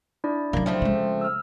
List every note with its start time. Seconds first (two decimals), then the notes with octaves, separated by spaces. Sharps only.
0.24 D4 E4 D5
0.53 C#3 F#3 A#3
0.66 F3 A3 C4
0.82 C#3 G#3
1.21 E6 F6